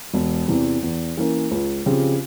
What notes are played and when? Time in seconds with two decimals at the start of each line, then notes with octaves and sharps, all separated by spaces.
0.14 E1
0.48 E2 C3 E3
0.83 E2
1.17 E3 A#3 C#4
1.51 C#2
1.86 C#3 F3 C4 G4